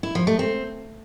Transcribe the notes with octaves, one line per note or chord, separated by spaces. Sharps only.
E4
F3
A3
C4